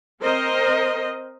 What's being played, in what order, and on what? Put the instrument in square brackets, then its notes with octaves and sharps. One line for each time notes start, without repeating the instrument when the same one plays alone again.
[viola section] C4 A#4 C5 D#5